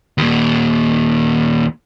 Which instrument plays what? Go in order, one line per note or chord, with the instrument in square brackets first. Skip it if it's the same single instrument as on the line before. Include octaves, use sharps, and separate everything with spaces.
[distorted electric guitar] D#2 A#2